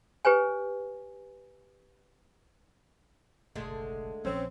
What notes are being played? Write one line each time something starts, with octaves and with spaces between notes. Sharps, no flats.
G4 B4 C#5 G#5
F#1 B1 D3 G#3 A3
A#1 F3 C4 C#4